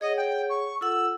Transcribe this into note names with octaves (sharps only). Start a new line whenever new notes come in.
G#4 C#5 D#5 F#5
G5
C#6
F4 A4 F#5 E6